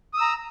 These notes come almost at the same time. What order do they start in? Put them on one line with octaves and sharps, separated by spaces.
D#6 E6 A#5